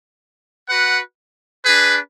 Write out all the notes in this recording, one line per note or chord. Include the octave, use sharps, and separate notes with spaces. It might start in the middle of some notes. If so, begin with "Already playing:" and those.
F#4 B4 F#5
D4 G#4 B4